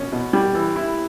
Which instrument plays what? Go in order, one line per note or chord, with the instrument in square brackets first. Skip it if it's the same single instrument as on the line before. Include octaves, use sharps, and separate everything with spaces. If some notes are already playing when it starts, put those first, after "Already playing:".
Already playing: [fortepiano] B2 C#4
B2
G3
E3
E4